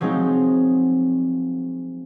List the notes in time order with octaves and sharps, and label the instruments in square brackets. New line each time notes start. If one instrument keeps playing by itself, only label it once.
[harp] F3 F#3 G#3 C4 D#4